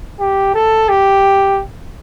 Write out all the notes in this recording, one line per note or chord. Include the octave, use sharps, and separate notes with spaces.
G4
A4
G4